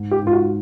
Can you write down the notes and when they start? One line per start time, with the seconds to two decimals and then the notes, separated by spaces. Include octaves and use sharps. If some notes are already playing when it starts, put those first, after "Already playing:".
Already playing: G#2
0.11 G4
0.23 G#2 F4
0.33 F#4